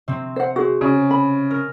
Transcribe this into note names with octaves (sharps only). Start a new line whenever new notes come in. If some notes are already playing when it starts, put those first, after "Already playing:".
C3 C4
C5 F#5
F#4 G#4 C5
C#3
B5
A#4